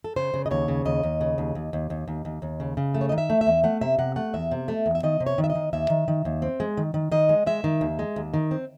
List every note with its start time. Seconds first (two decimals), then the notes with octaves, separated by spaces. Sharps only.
0.04 A4
0.16 C#3 C5
0.34 C#3
0.46 D#5
0.51 D#2 C#5
0.68 C#3
0.85 D#2 D#5
1.03 D#2
1.21 C#3
1.38 D#2
1.55 D#2
1.73 D#2
1.90 D#2
2.08 D#2
2.25 D#2
2.42 D#2
2.60 C#3
2.77 C#3
2.94 A3
3.01 C#5
3.09 D#3 D#5
3.18 E5
3.30 A3
3.41 E5
3.47 E2
3.64 A3 F#5
3.81 C3 E5
3.99 C3 F#5
4.16 A3 F#5
4.34 E2 E5
4.51 C3
4.68 A3
4.86 E2
4.95 E5
5.03 D#3 D#5
5.20 C3
5.26 C#5
5.38 D#3
5.44 E5
5.50 D#5
5.55 D#3
5.73 D#2 E5
5.90 D#3
6.08 D#3
6.25 D#2
6.42 C4
6.60 G#3
6.77 D#3
6.94 D#3
7.12 D#3 D#5
7.29 G#3
7.46 G#3 E5
7.64 D#3
7.81 D#2
7.99 G#3
8.16 D#2
8.34 D#3
8.51 C4